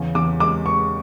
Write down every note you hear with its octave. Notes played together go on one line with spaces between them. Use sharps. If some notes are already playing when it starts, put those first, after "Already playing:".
Already playing: E2 C#3
E2 D6
G#3 D6
G#3 C#6